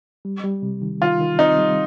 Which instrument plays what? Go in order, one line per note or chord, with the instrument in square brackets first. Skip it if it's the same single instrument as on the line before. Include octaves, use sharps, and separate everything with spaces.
[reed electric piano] G3
G3
C3
D#3
[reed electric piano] D#3 [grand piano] F4
[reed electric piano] D#3
[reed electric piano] C4 [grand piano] D#4
[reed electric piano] G3